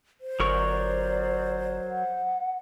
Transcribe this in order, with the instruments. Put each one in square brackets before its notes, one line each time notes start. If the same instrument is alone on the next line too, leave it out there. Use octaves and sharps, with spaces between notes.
[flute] C5
[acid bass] G1 [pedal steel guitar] F#3 A#4 C#6 [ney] D5
[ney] F#5